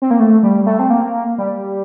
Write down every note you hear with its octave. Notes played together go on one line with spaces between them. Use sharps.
C4
A#3
A3
G3
A3
C4
A#3
G3